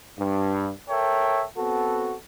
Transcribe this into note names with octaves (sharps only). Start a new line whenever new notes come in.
G2
A4 A#4 C#5 E5 G5
B3 C4 F#4 A4